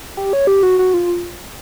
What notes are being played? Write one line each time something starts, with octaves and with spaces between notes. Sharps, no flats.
G4
C#5
G4
F#4
F#4
F4